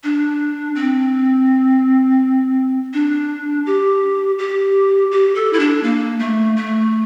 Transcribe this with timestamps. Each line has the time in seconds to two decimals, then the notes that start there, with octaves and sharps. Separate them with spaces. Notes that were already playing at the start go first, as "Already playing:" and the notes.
0.04 D4
0.75 C4
2.94 D4
3.66 G4
4.39 G4
5.11 G4
5.35 A4
5.53 E4
5.59 D4
5.83 A#3
6.19 A3
6.56 A3